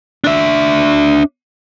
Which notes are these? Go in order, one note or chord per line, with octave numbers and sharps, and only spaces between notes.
D4 E5